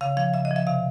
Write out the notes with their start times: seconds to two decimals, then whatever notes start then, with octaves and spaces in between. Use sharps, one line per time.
0.01 C#3 F5
0.17 F3 F5
0.34 C#3 E5
0.45 D#5
0.51 F3
0.56 E5
0.67 C3 F5